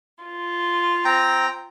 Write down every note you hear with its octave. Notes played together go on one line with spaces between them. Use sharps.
F4
C4 G5 A#5